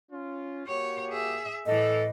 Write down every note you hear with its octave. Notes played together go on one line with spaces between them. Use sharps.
C#4 F4
A#3 F#4 G4 C#5
G#4 E5
A2 E3 A4 D#5